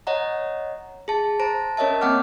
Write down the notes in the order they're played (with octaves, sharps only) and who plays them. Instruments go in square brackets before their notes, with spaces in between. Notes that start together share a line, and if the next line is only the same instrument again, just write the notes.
[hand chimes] C#5 D#5 F#5 A#5
G#4 A5
C5 A5 A#5 D7
C#4 A#4 C#5 D#5 E5 A5
A#3 C4 F#5 G5 D6 F6